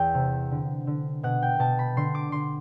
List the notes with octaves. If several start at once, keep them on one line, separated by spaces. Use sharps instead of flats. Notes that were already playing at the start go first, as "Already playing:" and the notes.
Already playing: E2 G5
C3
D3
D3
B2 F#5
G5
B2 A5
B5
D3 C6
D6
D3 C6